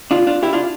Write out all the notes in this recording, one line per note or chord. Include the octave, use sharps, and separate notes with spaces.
D4 F4
D4 F4
E4 G4
D4 F4